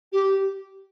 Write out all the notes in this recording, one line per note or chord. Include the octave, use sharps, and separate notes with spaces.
G4